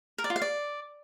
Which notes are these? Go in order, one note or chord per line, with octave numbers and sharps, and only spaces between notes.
A#4
D5
F4
F5
D5